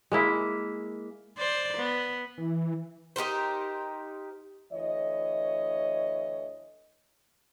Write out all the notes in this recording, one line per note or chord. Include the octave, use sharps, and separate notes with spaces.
G#3 A#3 E4
C5 D5
B3
E3
D#4 G4 A#4 C5
D2 E3 C#5 D#5